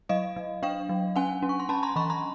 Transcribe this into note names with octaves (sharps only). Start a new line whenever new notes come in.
F#3 D#5 F5
F#3
D4 F5 G5
F#3
C#4 F#5 G#5
C#4
C#6
C6
C#4 A5 B5
A#5 C6
E3 B5 C#6
A#5 C6